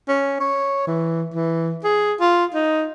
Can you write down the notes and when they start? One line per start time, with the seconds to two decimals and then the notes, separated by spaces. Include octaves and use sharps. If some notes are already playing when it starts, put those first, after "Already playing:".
0.08 C#4
0.40 C#5
0.87 E3
1.34 E3
1.84 G#4
2.20 F4
2.54 D#4